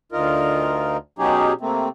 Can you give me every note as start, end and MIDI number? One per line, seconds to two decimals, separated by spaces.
0.12 0.97 38
0.12 0.97 63
0.12 0.97 65
0.12 0.97 70
1.19 1.53 47
1.19 1.53 54
1.19 1.53 61
1.19 1.53 63
1.19 1.53 67
1.19 1.53 68
1.61 1.88 48
1.61 1.88 57
1.61 1.88 58
1.61 1.88 60